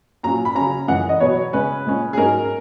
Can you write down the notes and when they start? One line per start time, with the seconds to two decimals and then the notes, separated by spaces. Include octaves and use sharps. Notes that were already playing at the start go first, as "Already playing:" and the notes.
0.23 A#2 F#3 C#4 A#5
0.45 B5
0.55 C#3 F#3 C#4 A#5
0.88 F#2 E3 G#3 F#5
1.09 D#5
1.20 B2 F#3 B3 C#5
1.53 C#3 G#3 C#4 B4
1.85 A#2 G#3 C#4
2.13 G#4
2.17 G#2 F#3 C#4 A#4